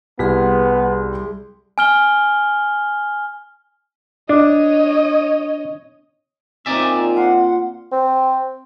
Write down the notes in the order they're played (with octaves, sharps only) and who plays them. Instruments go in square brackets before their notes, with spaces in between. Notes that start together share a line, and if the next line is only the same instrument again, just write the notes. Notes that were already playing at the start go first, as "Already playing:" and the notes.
[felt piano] C2 [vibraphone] G3 G#4 C6 [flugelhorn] B3
[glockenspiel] G#5 F6 G7
[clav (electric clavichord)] D4 [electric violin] C#5 D#5
[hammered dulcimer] A#2 G#5 [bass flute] C4 [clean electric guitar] D#4 D5 E5
[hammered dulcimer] F5 C6 [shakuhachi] F#5
[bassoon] C4